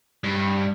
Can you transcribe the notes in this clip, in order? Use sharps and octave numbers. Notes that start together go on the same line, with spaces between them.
G2